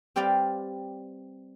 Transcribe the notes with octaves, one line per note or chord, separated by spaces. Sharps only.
G3 C4 G4 B4 D5 F5